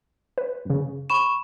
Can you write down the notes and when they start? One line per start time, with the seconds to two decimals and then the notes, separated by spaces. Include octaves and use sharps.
0.38 B4
0.65 F#2 C#3
1.10 B5 C#6 E7